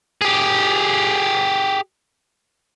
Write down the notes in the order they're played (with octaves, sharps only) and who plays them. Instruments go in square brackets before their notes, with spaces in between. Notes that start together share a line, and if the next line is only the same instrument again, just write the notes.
[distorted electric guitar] G4 G#4